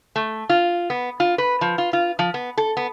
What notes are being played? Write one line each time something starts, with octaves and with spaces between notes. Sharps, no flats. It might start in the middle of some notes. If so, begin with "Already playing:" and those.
A3
F4
B3
F4
B4
F3
F4
F4
F3
B3
A4
B3